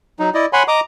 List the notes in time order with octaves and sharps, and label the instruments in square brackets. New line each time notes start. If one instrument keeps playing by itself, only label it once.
[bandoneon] F#3 D#4
E4 D5 D#5
C#5 F#5 G#5 B5 C6
D#5 A#5 D6 D#6